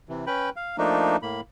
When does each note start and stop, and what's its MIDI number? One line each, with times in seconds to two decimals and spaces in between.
0.09 0.25 48
0.09 0.25 52
0.27 0.50 61
0.27 0.50 71
0.27 0.50 79
0.27 0.50 83
0.56 0.76 77
0.78 1.16 53
0.78 1.16 57
0.78 1.16 58
0.78 1.16 62
0.78 1.16 63
1.23 1.41 45
1.23 1.41 58
1.23 1.41 83